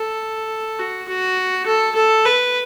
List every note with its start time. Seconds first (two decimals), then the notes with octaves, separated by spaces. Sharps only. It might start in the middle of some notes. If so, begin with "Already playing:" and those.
Already playing: A4
0.79 F#4
1.09 F#4
1.66 A4
1.95 A4
2.25 B4